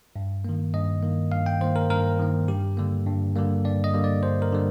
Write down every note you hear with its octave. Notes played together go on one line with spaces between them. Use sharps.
G2
D#3 A#3
G2 D#5
D#3 A#3
G2 F5
G5
D#3 A#3 C5
A#4
G2 A#4
D#3 A#3
G2 G4
D3 G3 A#3
G2
D3 G3 A#3
G2 D5
D#5
D3 G3 A#3
D5
G2 C5
A#4
D3 G3